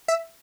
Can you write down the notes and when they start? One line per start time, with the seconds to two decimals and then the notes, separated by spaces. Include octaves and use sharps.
0.08 E5